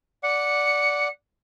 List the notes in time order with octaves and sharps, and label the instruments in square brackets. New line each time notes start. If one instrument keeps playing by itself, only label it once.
[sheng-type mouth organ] D5 F#5 [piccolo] C#7